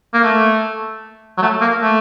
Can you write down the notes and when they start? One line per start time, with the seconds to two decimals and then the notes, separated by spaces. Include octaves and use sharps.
0.14 A#3
0.24 A3
1.38 F#3
1.42 A3
1.61 A#3
1.82 A3